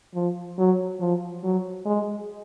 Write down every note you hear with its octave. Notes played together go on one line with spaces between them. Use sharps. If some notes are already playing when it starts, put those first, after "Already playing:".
F3
F#3
F3
F#3
G#3